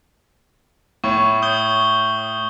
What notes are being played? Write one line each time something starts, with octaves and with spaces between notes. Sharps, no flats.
A2 C#5 C#6
D#6 G6 G7